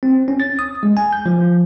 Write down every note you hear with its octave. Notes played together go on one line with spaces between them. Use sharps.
C4
C#4
A6
D#6
G#3
G#5
G6
F3